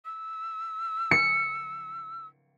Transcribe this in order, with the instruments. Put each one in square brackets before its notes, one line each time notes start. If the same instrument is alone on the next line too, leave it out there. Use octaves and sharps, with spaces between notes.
[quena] E6
[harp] C#7